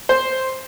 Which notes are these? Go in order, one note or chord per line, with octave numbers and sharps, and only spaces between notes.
C5